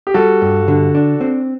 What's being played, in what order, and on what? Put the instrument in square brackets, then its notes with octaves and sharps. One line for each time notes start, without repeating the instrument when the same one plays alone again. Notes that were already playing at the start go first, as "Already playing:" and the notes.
[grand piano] G4
[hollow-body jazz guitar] G3 [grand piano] F#4 A4
[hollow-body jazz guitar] G2
D3
D4
C4